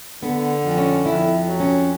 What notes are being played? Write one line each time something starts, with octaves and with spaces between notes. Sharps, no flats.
D3 B3
F2
C#4
F2 E4
F#3
C#4